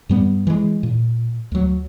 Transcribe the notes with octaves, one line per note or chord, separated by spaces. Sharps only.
G2 G3 B3
E3 G#3
A#2
D2 F#3